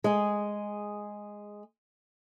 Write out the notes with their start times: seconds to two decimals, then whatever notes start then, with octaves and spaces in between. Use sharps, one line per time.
0.04 G#3 G#4